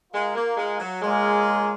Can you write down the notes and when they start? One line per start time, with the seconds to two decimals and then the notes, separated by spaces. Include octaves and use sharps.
0.13 G#3 F4 A#4 F5
0.35 A#3
0.57 G#3
0.80 F#3
1.01 G#3 A#3 F4 G#4 C#5 F5